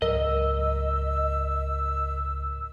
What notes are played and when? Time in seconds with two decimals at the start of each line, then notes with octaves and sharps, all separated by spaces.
0.02 C#2 G#2 F#3 A#4 D#5 E6